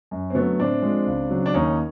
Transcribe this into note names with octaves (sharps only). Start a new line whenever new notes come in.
F#2
C4
D3 F#3 A3 B3
A2 C4 D4
F3 G#3
C#2
C#3 F#3
D4
D#2 C#4 D#4